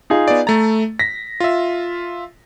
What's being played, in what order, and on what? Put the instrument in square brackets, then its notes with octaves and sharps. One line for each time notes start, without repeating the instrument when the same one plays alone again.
[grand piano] D#4 F4 G#4
[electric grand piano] B3 D5
[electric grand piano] A3 A#5 [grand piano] A6
[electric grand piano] A#6 [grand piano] B6
[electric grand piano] F4 E5